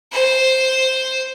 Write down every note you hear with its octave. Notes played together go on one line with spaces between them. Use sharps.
C5